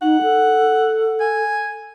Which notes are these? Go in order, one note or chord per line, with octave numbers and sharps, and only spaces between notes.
D#4 F#5
A4
G#5